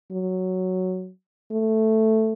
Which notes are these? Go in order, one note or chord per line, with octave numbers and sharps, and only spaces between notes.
F#3
A3